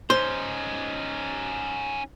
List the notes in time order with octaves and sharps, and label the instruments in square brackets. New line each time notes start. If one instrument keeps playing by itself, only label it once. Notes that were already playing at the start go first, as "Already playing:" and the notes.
[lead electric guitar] C#4 D#4 [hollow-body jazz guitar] C5